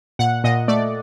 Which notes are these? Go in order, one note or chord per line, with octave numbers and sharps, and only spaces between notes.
A#2 F#5
A#2 D#5
A3 D5